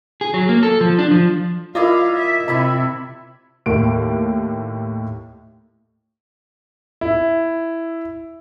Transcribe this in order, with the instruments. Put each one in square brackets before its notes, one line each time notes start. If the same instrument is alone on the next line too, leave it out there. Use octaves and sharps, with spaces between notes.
[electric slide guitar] G#4
F#3
A#3
A4
F3
D4
F3
[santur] E4 D5 D#5 [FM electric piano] F4 A#4 [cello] F5
[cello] E5
[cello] C3 [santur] E4 E5 B5
[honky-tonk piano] D#2 A2 A#3 G4 D7
[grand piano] E4